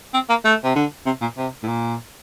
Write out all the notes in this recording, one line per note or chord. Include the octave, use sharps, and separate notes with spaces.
C4
A#3
A3
C3
D3
C3
A#2
C3
A2
A#2